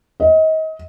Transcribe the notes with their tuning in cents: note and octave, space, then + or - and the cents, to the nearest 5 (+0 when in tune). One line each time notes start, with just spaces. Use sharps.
D#5 +30